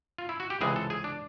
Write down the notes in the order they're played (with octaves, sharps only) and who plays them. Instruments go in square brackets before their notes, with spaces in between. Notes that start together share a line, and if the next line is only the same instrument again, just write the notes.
[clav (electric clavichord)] F4
E4
F#4
G4
C#2 C3 E3 G#3 G#4
A4
G#4
D4